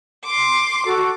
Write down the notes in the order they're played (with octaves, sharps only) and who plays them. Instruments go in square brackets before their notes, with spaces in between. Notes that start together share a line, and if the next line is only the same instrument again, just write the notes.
[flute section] C6 [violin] D6
[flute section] F#4 A4